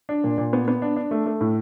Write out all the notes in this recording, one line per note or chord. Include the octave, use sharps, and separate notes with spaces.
D4
A#2
A#2
B3
B3
D4
D4
A3
A3
A2